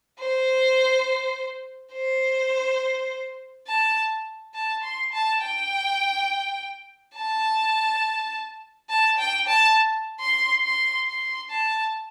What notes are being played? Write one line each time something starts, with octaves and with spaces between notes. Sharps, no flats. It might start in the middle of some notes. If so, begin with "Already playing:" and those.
C5
C5
A5
A5
C6
A5
G5
A5
A5
G5
A5
C6
C6
C6
A5